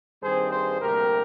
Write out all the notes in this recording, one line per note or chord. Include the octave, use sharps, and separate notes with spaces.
G2 D#3 G3 C4 G#4 C5
G#4 C5
D2 C3 G3 A#3 G4 A#4